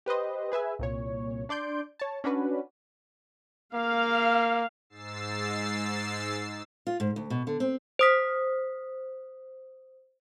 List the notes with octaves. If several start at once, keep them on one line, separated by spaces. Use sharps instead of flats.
G4 B4 C5 D#5
G#4 B4 E5 G#5
C2 A#2 C#5
D4 D5 C6 G6 D7
C#5 A5
C#4 D4 F#4 B4
A#3 F5
G#2 E6 A6 C7
F4
G#2
D2
B2
D3
C4
C5 D#6 B6